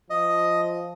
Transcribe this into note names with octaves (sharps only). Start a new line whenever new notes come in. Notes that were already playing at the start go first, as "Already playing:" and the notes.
F3 D#5